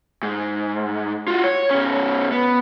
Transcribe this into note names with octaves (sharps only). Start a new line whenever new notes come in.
G#2
F4 F#4
C#5
B2 C#4
B3